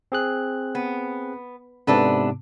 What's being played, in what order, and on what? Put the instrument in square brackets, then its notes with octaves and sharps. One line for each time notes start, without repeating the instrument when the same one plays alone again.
[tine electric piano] C4 G#4 F#6
[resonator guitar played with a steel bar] B3
[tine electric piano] G#2 C3 B3 [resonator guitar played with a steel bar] D4 A4 B4